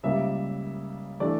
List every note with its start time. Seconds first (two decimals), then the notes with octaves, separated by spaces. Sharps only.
0.03 C#2 C#3 G3 A#3 E5
1.20 E3 A3 D4 D5